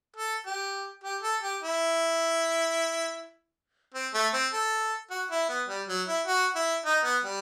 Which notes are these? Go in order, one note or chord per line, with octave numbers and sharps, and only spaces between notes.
A4
G4
G4
A4
G4
E4
C4
A3
C4
A4
F#4
E4
B3
G3
F#3
E4
F#4
E4
D#4
B3
G3